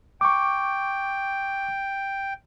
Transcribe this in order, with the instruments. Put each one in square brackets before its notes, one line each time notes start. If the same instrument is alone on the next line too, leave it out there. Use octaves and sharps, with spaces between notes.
[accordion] G5 [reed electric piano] C#6 D6